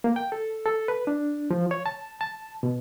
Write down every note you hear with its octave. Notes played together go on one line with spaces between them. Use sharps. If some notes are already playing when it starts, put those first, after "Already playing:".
A#3
G5
A4
A4
B4
D4
F3
C#5
A5
A5
B2